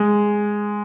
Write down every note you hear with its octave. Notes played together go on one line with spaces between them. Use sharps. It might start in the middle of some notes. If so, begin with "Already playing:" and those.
Already playing: G#3